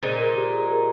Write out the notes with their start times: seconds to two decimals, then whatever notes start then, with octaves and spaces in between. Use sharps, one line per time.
0.03 A#2 G#3 D#4 C5
0.20 A#4
0.36 G4
0.53 G#4
0.70 A#4